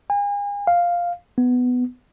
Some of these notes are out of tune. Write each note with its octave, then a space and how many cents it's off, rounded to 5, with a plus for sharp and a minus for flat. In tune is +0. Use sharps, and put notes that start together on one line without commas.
G#5 -40
F5 +0
B3 +10